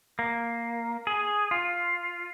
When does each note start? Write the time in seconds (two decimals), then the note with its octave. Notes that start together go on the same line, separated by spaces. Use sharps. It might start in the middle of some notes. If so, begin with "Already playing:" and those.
0.19 A#3
1.07 G#4
1.51 F4